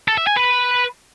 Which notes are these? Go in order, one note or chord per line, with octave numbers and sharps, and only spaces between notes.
A4
E5
G#5
B4